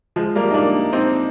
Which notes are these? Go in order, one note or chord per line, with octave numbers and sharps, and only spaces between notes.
F3 G#3
G3 A#3
D#4
A#3 D4
C4 D#4